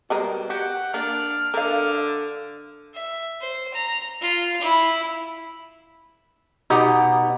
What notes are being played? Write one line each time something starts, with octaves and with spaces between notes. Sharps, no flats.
B2 G3 G#3 A#4
F#4 G4 F#5
A#3 D4 F6
D3 A#4 F5
E5
C5
A#5
F4
E4
B2 D#4 G4 F#5